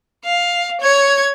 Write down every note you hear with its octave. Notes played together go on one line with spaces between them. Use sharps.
F5
C#5 G#6